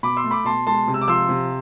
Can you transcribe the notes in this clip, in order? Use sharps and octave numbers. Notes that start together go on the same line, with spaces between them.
B2 B5 D6
C6 E6
A3
B5 D6
B2 A5 C6
G#3 A5 C6
C3
E6
D6
F3 C6 E6
C3